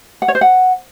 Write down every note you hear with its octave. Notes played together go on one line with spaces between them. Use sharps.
F#5
C#5
C5
F#5